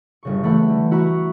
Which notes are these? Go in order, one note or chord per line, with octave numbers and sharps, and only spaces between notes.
G1 C#3 C#6
E3 A3 F#5 B5 G6
D3
E4 F#4 E5 A#5 B5 C#6